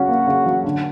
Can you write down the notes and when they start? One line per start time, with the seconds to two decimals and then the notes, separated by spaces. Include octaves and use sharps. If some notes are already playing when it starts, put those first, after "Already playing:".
Already playing: C#3 F#3 C#4 F#4
0.08 A#3
0.27 C#3
0.46 F#3
0.64 D3